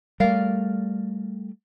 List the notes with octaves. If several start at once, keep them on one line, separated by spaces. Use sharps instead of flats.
G3 A3 A#4 D5 F5